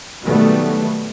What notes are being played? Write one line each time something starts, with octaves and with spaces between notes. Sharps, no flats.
B2 D#3 F#3 G3 A3 B3